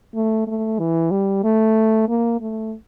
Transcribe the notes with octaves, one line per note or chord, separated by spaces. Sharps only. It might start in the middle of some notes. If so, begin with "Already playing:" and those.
A3
A3
E3
G3
A3
A#3
A3